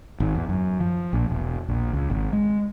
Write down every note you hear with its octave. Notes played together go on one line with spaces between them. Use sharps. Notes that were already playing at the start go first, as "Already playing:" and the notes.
G#1
E2
F#2
F3
A#1
E1
A#1
C#2
G#1
G#3